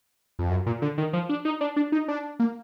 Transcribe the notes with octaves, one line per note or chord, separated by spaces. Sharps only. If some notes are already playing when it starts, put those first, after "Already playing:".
F2
F#2
A#2
D3
D#3
F3
D4
D#4
D4
D4
D#4
D4
A#3